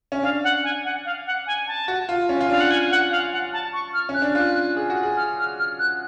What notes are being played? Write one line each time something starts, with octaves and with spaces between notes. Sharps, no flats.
C#4
D4 F5
F#5
G#5
F#5
F5
F#5
G#5
A5
F#4
F4
C#4
F4
D4 F5
F#5
G#5
F#5
F5
F#5
A5
C#6
F6
C#4
F#6
D4
F4 F#6
G#4
F#4
G#4
F6
F6
F6
F#6